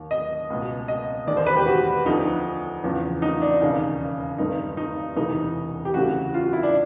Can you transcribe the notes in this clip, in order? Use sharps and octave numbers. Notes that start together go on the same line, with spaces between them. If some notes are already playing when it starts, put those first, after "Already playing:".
Already playing: D#2 D#3
D#5
C#2 B2
D#5
E1 D#2 D#3 D5
C5
B4
G4
F#4
D2 D3 F3 D#4
E2 C#3 F3
D#4
D4
E1 D#2 C#3 D#4
G1 G2 D#3 D#4
D#4
E1 D2 C3 E3 D#4
G4
D2 C#3 E3 F#4
F4
F#4
E4
D4